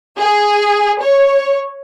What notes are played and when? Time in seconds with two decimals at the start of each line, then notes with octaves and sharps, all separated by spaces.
0.19 G#4
1.03 C#5